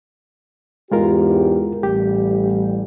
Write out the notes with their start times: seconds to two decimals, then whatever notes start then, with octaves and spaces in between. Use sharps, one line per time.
0.92 E2 G#2 G#3 F4 G4 A#4
1.83 A1 G3 G4